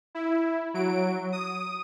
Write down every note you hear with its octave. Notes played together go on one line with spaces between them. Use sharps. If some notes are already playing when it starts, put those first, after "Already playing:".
E4
F#3 D7
D#6